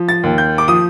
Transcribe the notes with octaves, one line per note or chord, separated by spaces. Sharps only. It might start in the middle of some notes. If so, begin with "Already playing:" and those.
Already playing: F3
A6
D#2
G6
D6
F3 D#6